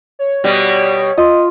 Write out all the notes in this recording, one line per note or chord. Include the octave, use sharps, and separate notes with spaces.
C#5
B2 G3 D5
F4 D#5